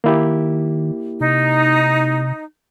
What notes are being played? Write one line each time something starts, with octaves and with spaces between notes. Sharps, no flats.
D#3 A#3 E4 G4
C3 D#4